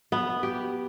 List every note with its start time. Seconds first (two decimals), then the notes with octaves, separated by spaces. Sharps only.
0.12 B3
0.43 G4